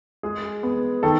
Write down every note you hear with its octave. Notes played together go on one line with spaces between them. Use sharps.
G#3 G#4
B3
D#3 A4